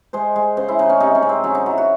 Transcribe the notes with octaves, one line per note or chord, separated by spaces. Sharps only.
G#3 C5
G#3
C#3 C5
E4
C#3 D#4
C#4
C3 D#4
C#4
C3
C4
F#3 C#4
D#4
F#3 E4
F#4